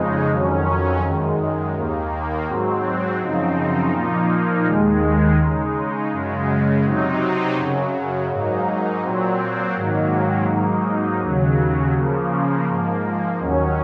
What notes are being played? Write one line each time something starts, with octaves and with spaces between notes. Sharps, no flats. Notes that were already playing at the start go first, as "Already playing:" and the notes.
Already playing: F2 C#3 G#3 D#4
F2 D#3 F#3 C#4
F#2 D#3 G#3
D#2 D#3 A#3
G#2 F#3 C4
F#2 C#3 F3 C4 D#4
A#2 F3 A#3 D#4
D#2 D#3 G#3
C#3 G#3 D#4
F#2 C#3 G#3
C3 F#3 C4 D#4
F#2 C#3 F#3
G#2 F#3 A#3 D#4
A#2 F#3 C4
G#2 D#3 F#3 A#3
G#2 F#3 A#3 D#4
D#2 C#3 F#3
C#3 F3 A#3
G#2 F3 A#3
D#2 D#3 F#3 C#4